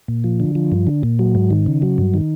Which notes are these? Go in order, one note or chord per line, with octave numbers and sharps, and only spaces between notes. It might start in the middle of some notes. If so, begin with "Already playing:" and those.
A#2
F3
D3
F3
G2
D3
A#2
F#3
G#2
D#3
C#3
F#3
G2
D#3